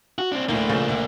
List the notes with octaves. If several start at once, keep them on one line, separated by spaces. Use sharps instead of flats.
F#4
C4 D4
D2 A2 A#3 D4
C#3 F3 A3
D2